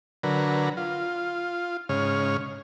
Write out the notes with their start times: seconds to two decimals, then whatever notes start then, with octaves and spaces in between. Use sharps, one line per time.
0.23 D3 F#3 A#4 B4
0.77 F4
1.89 G#2 C#3 C#5 F6